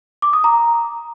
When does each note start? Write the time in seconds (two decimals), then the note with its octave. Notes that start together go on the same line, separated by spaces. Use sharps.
0.22 D6
0.33 D#6
0.44 A#5